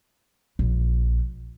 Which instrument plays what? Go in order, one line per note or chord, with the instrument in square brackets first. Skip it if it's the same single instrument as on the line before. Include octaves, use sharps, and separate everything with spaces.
[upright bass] A#1